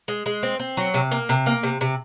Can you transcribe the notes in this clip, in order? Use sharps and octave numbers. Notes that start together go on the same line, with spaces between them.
G#3
G#3
C4
C4
F#3
C3
A#3
C3
A#3
C3
C3